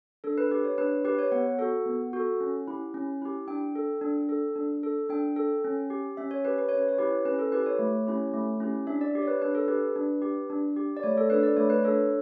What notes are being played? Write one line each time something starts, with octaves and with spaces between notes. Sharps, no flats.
D4 A4
B4
G4 B4
C#5
D4 B4
G4 B4
C#5
B3 F#5
F#4 A4
B3
F#4 A4
C#4
E4 G4
C#4
E4 G4
D4 G5
A4
D4
A4
D4
A4
D4 G5
A4
C#4
G4
C#4 E5
C#5
G4 B4
B4
C#4 C#5
B4
C#5
E4 G4 B4
C#4 B4
A4
E4 G4 B4
C#5
A3
C#4 E4 G4
A3
C#4 E4 G4
D4 E5
D5
G4
C#5
B4
D4 B4
A4
G4 B4
D4
G4
D4
G4
D5
A3 C#5
A4
D4 A4 B4
D5
A3 C#5
B4
D4 A4 C#5